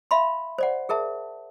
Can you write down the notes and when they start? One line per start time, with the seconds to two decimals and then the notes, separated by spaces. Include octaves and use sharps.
0.11 E5 F5 B5 C6
0.58 C5 D5 F#5
0.89 G#4 A#4 E5 A5